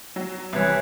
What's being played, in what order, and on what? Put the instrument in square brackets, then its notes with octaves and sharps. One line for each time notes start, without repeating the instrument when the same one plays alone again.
[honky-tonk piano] F#3
[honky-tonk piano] C2 [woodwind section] E3 B4 C#5